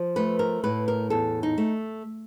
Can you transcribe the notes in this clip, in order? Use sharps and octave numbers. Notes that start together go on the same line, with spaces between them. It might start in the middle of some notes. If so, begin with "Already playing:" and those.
Already playing: F3
A3 B4
A#4
A2 B4
A#4
E2 A4
D#4
A3